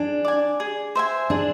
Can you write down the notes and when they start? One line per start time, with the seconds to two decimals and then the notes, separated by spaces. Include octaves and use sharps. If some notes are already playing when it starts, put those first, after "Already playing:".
Already playing: D4 G#4
0.25 D5 G#5
0.60 G#4
0.95 C5 E5 G#5
1.30 D4 G#4